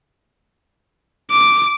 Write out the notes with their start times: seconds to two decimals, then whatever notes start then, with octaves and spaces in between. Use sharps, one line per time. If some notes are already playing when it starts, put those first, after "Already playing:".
1.31 D6